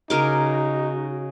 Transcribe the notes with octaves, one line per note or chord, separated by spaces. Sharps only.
C#3 D#4 F#4 A#4 D6